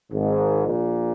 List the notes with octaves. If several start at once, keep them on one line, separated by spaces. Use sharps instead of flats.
G#1 G#2
A#1 A#2